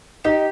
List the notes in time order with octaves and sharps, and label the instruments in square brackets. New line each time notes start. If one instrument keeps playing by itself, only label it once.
[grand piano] D#4 [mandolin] G4